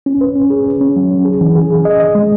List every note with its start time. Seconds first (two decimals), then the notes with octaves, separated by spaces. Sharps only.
0.06 C#4
0.21 B4
0.35 C#4
0.50 G#4
0.66 C#4
0.81 C#4
0.96 F#3
1.11 C#4
1.25 G#4
1.41 E3
1.56 G#4
1.70 G#4
1.85 D#5
2.00 D#5
2.15 G#3